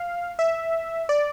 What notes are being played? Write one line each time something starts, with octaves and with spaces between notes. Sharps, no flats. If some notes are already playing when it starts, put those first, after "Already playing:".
Already playing: F5
E5
D5